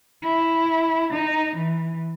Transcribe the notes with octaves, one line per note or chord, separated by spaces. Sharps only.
E4
D#4
E3